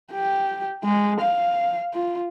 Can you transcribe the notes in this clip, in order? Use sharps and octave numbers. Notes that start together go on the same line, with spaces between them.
G4
G#3
F5
F4